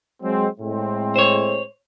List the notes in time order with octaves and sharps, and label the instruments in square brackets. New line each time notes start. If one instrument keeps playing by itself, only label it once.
[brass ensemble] F#3 G#3 C4
A2 G#3 C4
[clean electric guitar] C5 C#5